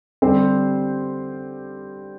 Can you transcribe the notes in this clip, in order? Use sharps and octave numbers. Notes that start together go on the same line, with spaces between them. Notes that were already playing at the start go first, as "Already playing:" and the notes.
D3 G3 C4 G4 C5